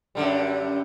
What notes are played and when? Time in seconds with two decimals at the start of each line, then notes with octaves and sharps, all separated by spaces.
0.15 F#2 D3 G3